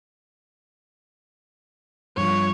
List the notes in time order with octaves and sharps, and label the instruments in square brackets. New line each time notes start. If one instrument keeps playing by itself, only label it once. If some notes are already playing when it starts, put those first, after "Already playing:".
[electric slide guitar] G2 F3 [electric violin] C#5